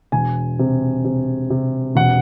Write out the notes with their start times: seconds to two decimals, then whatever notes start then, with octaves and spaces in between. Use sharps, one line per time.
0.12 E1 G#5
0.59 C3
1.05 C3
1.50 C3
1.95 E1 F#5